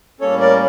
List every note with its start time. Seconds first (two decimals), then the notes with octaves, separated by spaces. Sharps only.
0.21 A2 G3 A#3 C#4 A4 C#5
0.40 A#4 D5